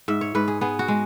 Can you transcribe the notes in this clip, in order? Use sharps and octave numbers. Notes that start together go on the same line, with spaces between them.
G#2 E5
C#5
G#2 B4
G#4
B3 G#4
F#4
G#3